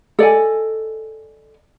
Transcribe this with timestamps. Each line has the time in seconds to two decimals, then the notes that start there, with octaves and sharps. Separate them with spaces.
0.19 A4 D5 D#5 G#5